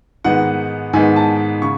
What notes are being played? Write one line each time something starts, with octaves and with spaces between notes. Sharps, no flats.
G#2 D#3 G#3 B3 F#5
G#2 D#3 G#3 B3 G#5
A5
C#3 C#6